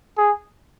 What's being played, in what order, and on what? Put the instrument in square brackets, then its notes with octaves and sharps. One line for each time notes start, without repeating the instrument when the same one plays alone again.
[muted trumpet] G#4